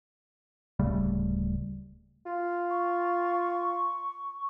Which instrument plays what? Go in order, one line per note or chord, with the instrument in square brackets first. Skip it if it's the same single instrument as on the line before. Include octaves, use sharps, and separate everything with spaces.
[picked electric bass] D1 C#3 G3 A3
[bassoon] F4
[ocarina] C#6